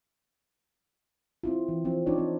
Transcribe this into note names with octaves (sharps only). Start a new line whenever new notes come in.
C4 E4 F4
E3
F3 C4
D4 D#4 F4 C#5 D5
C4